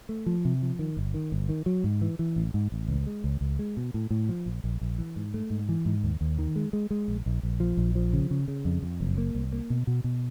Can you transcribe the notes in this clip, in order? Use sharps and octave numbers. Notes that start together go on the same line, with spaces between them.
A3
F3
C3
F3
D#3
G1
D#3
G1
D#3
F#3
G#2
E3
E3
A1
G#2
A1
C#2
G#3
C#2
C#2
G#3
B2
A2
A2
F3
A#1
A#1
A#1
E3
G#2
A3
G#2
E3
G#2
D#2
D#2
D#3
G#3
G#3
G#3
A#1
A#1
A#1
F3
A#1
F3
C#3
C#3
C#3
F2
F2
F#1
A#3
C2
A#3
B2
B2
B2